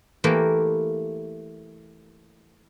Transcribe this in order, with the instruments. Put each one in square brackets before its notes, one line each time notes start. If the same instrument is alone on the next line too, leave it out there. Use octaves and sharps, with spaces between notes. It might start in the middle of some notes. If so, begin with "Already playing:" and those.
[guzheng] E3 A3 A#3 G4 A#4